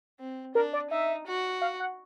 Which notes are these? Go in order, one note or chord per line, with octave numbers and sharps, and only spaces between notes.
C4
D4 A#4
D5
D#4 E5
F#4
F5
F#5